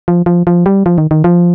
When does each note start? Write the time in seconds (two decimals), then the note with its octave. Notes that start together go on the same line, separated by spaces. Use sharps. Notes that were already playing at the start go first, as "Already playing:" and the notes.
0.08 F3
0.26 F3
0.47 F3
0.66 G3
0.86 F3
0.98 D#3
1.11 D#3
1.24 F3